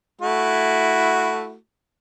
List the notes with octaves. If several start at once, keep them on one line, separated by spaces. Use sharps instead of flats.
A3 E4 F#4